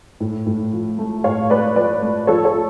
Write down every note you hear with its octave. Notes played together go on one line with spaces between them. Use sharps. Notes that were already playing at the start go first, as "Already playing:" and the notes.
A2
A2
F3
A3
A2 C#5 F5
A3 B4 D5
F3 B4 D5
A3
F3 A4 C#5
A4 C#5
F3